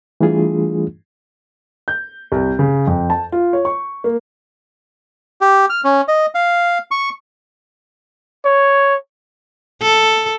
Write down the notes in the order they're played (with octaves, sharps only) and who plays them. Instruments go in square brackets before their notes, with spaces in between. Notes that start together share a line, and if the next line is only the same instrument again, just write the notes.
[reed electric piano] E3 G3 A3 D4 F4 G#4
[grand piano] G6
C2
C#3
F2
A5
F4
C#5
C#6
A#3
[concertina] G4
F6
C#4
D#5
F5
C#6
[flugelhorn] C#5
[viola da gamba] A4